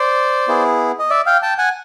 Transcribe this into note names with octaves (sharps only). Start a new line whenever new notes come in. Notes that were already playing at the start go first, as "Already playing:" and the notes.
Already playing: C5 D5
B3 E4 G#4
D#5
D5 E5
F5 G5
G5 A5
F#5 G#5